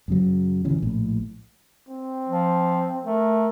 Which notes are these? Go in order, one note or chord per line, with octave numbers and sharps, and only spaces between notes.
F#2 C#3 F#3
D1 C#3 E3 C#4
A#1 A2
C4
F3
A3 A#4